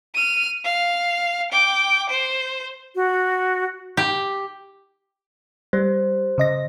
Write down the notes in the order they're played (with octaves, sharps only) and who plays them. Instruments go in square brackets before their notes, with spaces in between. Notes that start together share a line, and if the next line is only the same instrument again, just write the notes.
[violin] F6 D#7
F5
G5 D6
C5
[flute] F#4
[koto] G4
[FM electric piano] G3 [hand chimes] C5
[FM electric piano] C#3 D#5 A#6